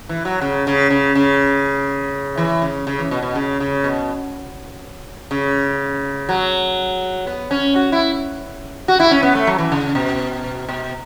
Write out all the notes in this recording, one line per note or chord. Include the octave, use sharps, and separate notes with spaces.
E3
F#3
C#3
C#3
C#3
C#3
E3
C#3
C#3
E3
B2
B2
C#3
C#3
B2
C#3
F#3
B3
C#4
F#4
E4
F#4
E4
C#4
B3
A3
F#3
E3
C#3
B2
B2